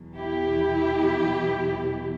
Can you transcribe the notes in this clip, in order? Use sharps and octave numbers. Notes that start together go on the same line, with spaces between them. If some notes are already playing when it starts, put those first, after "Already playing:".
Already playing: E2 B2 F#3
E4 G4